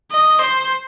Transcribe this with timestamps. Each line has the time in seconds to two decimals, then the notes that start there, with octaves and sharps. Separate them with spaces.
0.11 D#5
0.39 C5